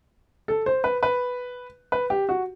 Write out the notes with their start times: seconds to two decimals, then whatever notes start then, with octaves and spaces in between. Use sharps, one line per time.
0.48 A4
0.66 C5
0.84 B4
1.03 B4
1.92 B4
2.10 G4
2.29 F#4